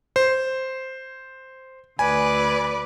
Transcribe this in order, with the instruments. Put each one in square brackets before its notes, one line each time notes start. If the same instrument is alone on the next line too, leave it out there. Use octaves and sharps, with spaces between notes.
[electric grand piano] C5
[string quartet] D2 B4 D5 [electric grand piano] G#5